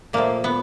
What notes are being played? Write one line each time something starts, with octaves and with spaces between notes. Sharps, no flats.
A#2 F3 A3 A#3
B3